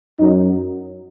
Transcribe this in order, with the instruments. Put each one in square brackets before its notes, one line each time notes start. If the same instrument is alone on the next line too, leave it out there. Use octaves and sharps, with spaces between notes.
[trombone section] F#2 F#3 D#4